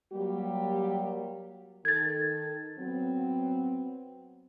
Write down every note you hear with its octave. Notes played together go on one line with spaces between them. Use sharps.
F#3 G3 A#3 G4
D#3 A4 G#6 A6
F#3 B3 C4